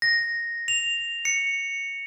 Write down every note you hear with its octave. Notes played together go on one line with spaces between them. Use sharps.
A#6
F7
C#7